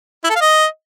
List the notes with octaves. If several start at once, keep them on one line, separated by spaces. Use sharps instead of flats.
E4
A4
F5
D#5